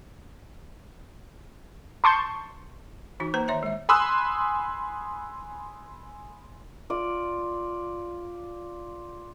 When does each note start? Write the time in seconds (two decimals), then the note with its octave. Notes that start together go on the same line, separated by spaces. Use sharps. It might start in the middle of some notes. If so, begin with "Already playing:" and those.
2.04 A5 C6 C#6 G6
3.20 E3 D#4 F#4
3.34 A#3 B4 C5 A#5
3.48 D#3 C#5 E5 A#5
3.63 G#3 E5
3.89 G#5 B5 C6 D#6 E6 F#6
6.90 F4 D5